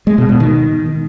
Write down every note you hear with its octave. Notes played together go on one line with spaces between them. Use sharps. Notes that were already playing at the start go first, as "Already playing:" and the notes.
G#3
B2
B2
D#3